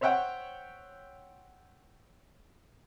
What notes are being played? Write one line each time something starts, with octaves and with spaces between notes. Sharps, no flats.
C5 C#5 E5 F#5 G5